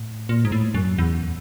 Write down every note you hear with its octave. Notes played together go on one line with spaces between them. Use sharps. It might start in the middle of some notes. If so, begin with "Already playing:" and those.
Already playing: A2
A#2
G#2
A2
F#2
E2